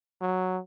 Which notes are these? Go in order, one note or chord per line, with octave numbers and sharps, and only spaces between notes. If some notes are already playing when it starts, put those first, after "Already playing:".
F#3